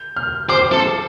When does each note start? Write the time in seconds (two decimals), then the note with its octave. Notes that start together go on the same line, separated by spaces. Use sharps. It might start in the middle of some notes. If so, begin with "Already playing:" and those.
Already playing: G6
0.16 F6
0.49 C5 D6
0.72 A4